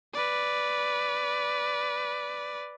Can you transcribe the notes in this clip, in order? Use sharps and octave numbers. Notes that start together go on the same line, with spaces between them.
B4 D5